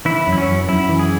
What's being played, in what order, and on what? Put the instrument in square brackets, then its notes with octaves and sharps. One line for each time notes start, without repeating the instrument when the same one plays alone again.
[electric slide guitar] E3 E4
F#2
E4
C#4
F#2
F#2 E4
E3
G#4